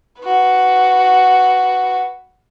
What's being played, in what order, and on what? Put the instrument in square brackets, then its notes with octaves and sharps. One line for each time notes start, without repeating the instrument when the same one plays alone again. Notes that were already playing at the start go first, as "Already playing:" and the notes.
[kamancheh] F#4 B4